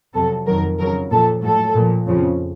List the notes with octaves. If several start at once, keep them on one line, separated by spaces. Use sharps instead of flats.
F2 C3 F#3 A4
F2 D#3 F#3 A#4
F2 C#3 F#3 A#4
A#2 F3 A4
A2 F#3 A4
A#2 F3
F2 C#3 F3